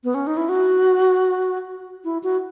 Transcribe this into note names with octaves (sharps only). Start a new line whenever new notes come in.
B3
C#4
D#4
E4
F#4
E4
F#4